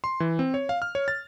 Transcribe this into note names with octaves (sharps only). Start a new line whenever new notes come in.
C6
E3
C4
C#5
F5
F6
C#5
A6